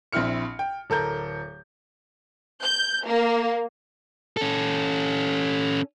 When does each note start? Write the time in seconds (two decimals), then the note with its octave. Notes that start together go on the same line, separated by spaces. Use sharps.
0.13 A#1 C4 E4 F6 C#7
0.59 G5
0.90 D1 A4 A#4 G6
2.63 G6
3.07 A#3
4.37 C#4 A4